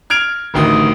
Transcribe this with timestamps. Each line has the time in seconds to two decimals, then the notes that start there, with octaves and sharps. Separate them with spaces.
0.10 F6 G#6 D7 F7
0.54 A1 D2 D#3 D#6